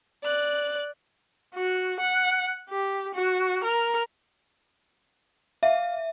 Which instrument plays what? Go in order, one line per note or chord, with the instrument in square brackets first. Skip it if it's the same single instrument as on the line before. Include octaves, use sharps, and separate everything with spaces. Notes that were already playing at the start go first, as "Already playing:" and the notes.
[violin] D5 F#6
[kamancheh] F#4
F#5
G4
F#4
A#4
[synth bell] E5 [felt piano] F5